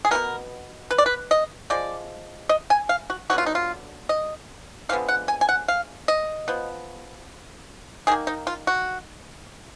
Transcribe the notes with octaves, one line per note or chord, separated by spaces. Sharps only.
G#4
B2 G#3 B3 A#4
B4
D5
B4
D#5
F3 G#3 D5
D#5
G#5
F5
F#4
D3 F#3 B3 F#4
F4
D#4
F4
D#5
D3 F3 G#3 B3 F5
F#5
G#5
G#5
F#5
F5
D#5
F3 B3
D#3 A#3 G#4
D#4
F4
F#4